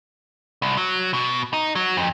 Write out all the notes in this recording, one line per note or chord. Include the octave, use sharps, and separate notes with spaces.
C2
F#3
B2
D#4
F#3
F2